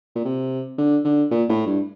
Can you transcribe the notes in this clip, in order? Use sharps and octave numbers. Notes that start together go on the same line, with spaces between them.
A#2
C3
D3
D3
A#2
A2
G2